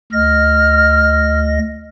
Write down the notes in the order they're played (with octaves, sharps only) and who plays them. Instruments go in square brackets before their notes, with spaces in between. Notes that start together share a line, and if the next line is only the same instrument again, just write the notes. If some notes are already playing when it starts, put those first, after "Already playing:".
[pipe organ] D2 D#5 A#6 [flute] F6